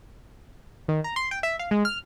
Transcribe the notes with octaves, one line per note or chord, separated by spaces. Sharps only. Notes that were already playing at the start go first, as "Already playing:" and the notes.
D#3
A#5
C6
G5
E5
F5
G#3
F6